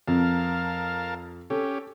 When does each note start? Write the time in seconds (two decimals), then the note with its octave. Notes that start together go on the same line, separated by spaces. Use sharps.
0.08 F2 A#4 F5 A5
1.50 C#4 G4 A4